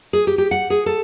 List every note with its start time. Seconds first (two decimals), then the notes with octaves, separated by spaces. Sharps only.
0.13 G#4
0.27 G4
0.38 G4
0.51 F#5
0.70 G#4
0.86 A4